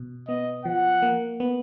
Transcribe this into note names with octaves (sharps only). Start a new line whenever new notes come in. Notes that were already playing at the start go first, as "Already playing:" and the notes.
Already playing: B2
B3 D#5
F3 F#5
A#3
B3